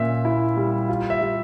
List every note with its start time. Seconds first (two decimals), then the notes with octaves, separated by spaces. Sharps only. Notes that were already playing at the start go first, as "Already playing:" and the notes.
Already playing: A#2 C#4 E5
0.25 E4
0.57 G3
0.89 F4
1.10 E5
1.21 G3